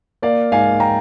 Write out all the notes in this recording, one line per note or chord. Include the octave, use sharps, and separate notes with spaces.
A#3 D5 F5
G#2 F5 G#5
G5 A#5